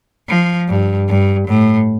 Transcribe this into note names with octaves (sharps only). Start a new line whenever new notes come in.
F3
G2
G2
A2